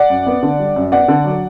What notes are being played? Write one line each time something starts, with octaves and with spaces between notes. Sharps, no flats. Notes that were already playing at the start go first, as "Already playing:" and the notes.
Already playing: D5 F#5
F#2
B3
D3
G3
F#2
B3 D5 F#5
D3
F#3